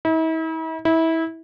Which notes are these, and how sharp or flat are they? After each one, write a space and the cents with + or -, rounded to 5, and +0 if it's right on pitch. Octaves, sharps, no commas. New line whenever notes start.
E4 -45
E4 -25